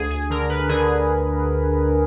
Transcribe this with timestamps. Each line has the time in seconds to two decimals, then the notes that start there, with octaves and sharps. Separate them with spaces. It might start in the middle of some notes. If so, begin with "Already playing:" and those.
Already playing: D2 G#4
0.11 G#4
0.30 D3 A#4
0.49 B4
0.69 D3 G#4